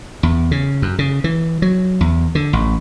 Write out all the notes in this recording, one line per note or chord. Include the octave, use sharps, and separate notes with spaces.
E2
C#3
F#2
C#3
E3
F#3
E2
D3
A1